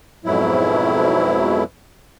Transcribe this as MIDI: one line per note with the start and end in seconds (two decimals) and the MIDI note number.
0.25 1.64 41
0.25 1.64 44
0.25 1.64 47
0.25 1.64 54
0.25 1.64 64